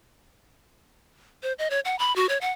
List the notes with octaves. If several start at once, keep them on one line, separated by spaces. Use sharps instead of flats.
C5
D#5
C#5
F#5
B5
F#4
C#5
F#5